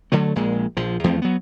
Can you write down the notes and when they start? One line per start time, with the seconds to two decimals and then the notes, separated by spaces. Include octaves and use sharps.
0.12 D3 F#3 A3
0.35 A#1 A#2 G#3
0.77 A#1 F3
1.04 E2 F3 A3 C4
1.22 F#3 B3